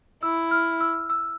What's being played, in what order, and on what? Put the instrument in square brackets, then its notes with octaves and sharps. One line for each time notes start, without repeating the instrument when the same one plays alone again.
[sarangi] E4 [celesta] E6
[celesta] F6
E6
E6